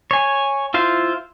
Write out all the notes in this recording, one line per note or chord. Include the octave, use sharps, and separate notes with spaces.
C#5 G#5
E4 F4 C5